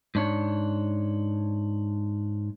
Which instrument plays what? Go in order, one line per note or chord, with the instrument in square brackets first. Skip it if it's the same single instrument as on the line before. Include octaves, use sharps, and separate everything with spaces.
[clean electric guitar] G#2 D4 C#5